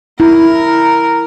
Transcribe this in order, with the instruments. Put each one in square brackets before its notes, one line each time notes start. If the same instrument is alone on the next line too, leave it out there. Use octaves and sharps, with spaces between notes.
[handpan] E4 [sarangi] A#4